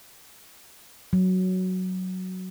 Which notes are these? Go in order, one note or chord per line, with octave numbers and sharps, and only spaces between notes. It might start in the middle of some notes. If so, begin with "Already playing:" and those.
F#3